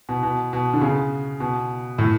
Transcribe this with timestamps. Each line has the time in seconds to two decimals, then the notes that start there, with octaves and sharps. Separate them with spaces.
0.09 B2
0.23 B2
0.53 B2
0.73 D3
0.81 C#3
1.40 B2
1.98 A2